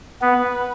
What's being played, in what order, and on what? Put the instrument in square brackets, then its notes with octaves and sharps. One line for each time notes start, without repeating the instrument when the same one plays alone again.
[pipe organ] B3 [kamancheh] B4